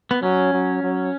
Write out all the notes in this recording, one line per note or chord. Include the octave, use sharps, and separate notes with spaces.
B3
F#3 C#4
F#3
F#3